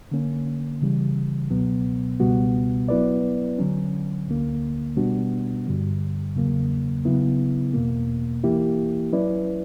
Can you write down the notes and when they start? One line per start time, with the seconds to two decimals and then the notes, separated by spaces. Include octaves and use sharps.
0.11 D3 A#3 C#4
0.82 C#3 E3 G3
1.50 C#2 B2 F#3 B3
2.20 C#2 B2 G3 B3 F#4
2.88 F#3 B3 E4 B4 D5
3.59 D3 F#3 C#4
4.28 D2 D3 A#3
4.97 B2 G3 B3 D4 F#4
5.67 G2 D3 G3
6.35 E2 C#3 F#3 A#3
7.05 C#3 F#3 B3 E4
7.74 E2 B2 A#3
8.44 E3 A#3 E4 G4
9.13 F#3 C#4 E4 B4 D5